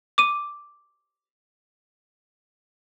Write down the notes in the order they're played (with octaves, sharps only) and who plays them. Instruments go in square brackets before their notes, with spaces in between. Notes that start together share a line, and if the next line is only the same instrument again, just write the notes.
[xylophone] D6 D#7